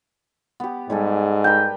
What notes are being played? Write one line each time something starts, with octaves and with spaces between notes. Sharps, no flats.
B3 G4
G#2 G3 G#4 A4
A#4 B4 G5 G6